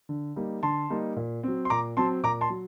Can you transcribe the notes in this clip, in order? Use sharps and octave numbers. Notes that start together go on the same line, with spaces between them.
D3
G3 A#3 D#4
D3 A5 C6
G3 A#3 D#4
A#2
F#3 C4
C6
A#2 A#5 D6
F#3 C4 A5 C6
A#2 A#5 D6
A5 C6
F#3